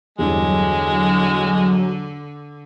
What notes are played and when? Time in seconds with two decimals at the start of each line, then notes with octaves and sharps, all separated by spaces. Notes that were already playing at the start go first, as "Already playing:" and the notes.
0.19 E2 G2 D3 F#3 G#3